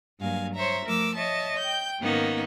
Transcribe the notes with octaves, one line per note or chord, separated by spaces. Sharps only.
G2 F#3 A#3 F5 G#5
C5 C#5 E5 A#5
F3 A3 A#4 D6 E6
C#5 D#5 E5 A5
G5 G6
G#2 D#3 A#3 B3 C#4 D#4